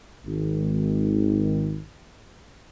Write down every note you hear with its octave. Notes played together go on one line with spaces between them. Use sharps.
G#1 D#3